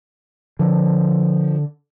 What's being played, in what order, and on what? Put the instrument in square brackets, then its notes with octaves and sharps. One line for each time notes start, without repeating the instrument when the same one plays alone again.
[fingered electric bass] D3 [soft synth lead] F3